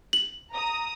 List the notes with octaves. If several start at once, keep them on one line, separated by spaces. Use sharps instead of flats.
F#7
A#5 D#6